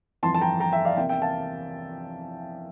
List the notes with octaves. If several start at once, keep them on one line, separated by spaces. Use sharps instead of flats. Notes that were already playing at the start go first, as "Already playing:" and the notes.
G1 F2 E3 A5 C6
A5
G5 A#5
G5 A#5
E5 G5
D5 F5
E2 C3 E3 A#3 E5 G5
E5 G5
F5 A5